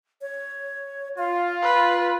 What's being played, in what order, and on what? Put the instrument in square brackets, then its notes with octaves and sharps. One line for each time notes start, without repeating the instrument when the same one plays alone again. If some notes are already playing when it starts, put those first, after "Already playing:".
[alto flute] C#5
[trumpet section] F4 [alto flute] F5
[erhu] B4